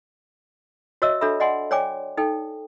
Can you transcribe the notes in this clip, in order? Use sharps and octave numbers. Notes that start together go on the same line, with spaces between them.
F#4 C#5 D#5 E5 E6
D4 F#4 A4 E5 B5
D5 D#5 F#5 G#5 C6
C#5 D5 G5 G#5 D6
D#4 A4 G5